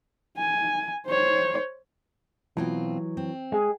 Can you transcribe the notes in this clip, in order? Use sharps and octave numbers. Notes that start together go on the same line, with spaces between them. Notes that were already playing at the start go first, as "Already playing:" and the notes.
G#5
C5 C#5
B2 E3 F#3 C4 F4
C4
G#3 G#4